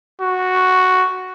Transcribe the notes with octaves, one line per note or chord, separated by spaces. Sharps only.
F#4